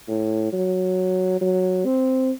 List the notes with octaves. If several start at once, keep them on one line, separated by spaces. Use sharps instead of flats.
A2
F#3
F#3
C4